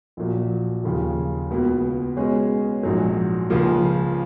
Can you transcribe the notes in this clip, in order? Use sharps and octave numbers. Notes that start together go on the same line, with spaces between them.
A#1 A#2 F#3
D#2 C#3 F3
C#2 B2 A#3
B2 G#3 C#4 G#4
A#1 G#2 F#3
C#2 C#3 F3 A#3